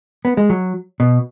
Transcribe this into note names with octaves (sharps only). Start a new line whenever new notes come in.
B3
G#3
F#3
B2